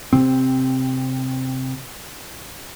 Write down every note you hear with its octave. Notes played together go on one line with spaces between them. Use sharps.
C3 C4